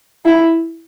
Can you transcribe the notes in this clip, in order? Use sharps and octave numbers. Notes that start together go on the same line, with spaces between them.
E4